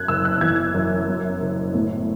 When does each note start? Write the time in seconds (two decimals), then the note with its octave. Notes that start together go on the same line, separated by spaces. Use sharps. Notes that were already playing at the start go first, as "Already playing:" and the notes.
Already playing: F#2 F#6 G#6
0.08 F#1 E6
0.25 F#6
0.41 E3 G#6
0.74 F#2
1.08 F#2
1.41 F#1
1.75 A2